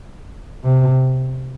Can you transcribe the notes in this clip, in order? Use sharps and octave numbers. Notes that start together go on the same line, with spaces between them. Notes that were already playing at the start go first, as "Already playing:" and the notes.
C3